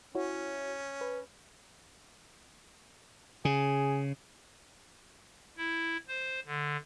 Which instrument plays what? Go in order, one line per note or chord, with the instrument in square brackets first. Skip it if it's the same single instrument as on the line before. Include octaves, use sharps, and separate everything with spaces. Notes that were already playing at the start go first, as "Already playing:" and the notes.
[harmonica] C#4 [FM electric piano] E4 F#4 C#5
[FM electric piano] B4
[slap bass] C#3 [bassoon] G#4
[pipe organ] E4
C5
D3